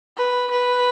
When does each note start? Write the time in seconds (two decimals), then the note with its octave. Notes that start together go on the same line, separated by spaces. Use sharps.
0.17 B4
0.51 B4